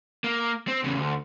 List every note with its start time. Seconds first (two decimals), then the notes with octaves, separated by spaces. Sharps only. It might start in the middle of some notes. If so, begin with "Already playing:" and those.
0.24 A#3
0.68 C4
0.84 E2 C#3
0.97 D2